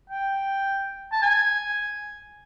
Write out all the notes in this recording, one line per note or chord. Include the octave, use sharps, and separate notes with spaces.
G5
A5
G#5